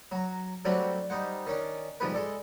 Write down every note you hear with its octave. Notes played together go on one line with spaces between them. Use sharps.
F#3 A#5
F#3 G3 A3 C4 D4 F#4
G3 D#4 C5 F#5
D#3 C#4 D4
C2 G#2 F3 G3 B3 B4
G#3 A4 D5